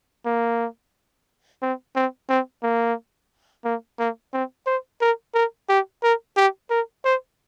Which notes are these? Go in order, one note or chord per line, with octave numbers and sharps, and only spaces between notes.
A#3
C4
C4
C4
A#3
A#3
A#3
C4
C5
A#4
A#4
G4
A#4
G4
A#4
C5